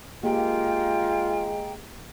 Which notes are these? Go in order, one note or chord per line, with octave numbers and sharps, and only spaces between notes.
G#3 A#3 F4 G4 F5 G5 A#5